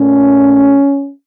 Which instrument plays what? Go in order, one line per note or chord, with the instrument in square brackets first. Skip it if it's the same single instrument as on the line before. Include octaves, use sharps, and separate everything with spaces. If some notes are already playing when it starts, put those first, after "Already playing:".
Already playing: [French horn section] A#2 A3 C#4